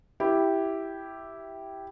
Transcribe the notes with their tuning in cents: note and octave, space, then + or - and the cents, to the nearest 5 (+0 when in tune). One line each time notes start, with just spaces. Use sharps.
E4 +0 G4 -5